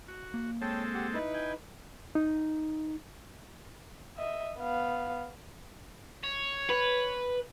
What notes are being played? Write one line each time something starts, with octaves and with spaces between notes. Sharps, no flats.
F#4
A#3
G#3 C4 A4 C#5 G5 A5
G4 F#5
D#4 E4 B4
G5 G#5
D#4
D#5 E5
B3 F5
C#5
B4